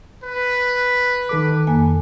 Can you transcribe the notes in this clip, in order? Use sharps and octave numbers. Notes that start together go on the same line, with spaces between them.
B4
D#3 A4 D6
F2 A#3 G#5